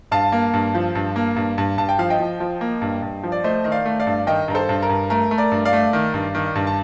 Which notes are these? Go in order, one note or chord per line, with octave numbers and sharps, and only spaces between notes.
G2 F5 A5
A#3
G2
F3
G2
A#3
G2
G2
G2 A5
G5
F3 F5
D#5 G5
F3
F3
A#3
G2
G2
F3
D5
A3 C5 D#5
D#3 D#5
D5 F5
A3
D5 F5
G2
D#3 D#5 G5
G2 A#4
A4 C5
G2
A#4
G2
A3 A#4
A3
A#4 D5
G2
D5 F5
A3
D#3
G2
D#3
G2
A5